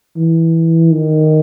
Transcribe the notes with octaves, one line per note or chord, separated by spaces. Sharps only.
E3
D#3